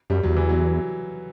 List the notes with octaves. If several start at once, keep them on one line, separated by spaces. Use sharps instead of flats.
F#2 G3
E2 F#3
E3
F#3